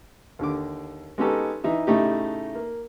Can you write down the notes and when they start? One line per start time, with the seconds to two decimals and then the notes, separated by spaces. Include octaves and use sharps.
0.39 D#2 D3 D6
1.18 G#3 B3 C#4 D#4 G4 A4
1.64 E3 D#4 E5
1.87 A2 C#3 A3 D#4 G4
2.55 A#3